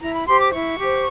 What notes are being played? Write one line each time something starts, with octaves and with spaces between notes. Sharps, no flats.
E4 A#5
B5
G4 C5 C6
D6
E4 C#6
G4 C5